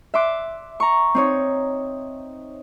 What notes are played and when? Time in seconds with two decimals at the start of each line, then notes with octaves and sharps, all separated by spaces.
0.14 E5 C6 D6 F#6
0.80 A#5 C#6
1.15 C4 D#4 C#5